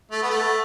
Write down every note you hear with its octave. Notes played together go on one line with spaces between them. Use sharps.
A3
B3
A3